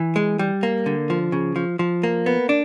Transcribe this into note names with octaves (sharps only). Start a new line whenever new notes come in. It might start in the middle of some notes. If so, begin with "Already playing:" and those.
Already playing: E3
G#3
G3
A#3
D3
F3
C#3
F3
F3
A#3
B3
D4